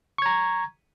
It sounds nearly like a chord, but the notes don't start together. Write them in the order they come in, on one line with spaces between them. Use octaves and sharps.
C#6 G#6 A#5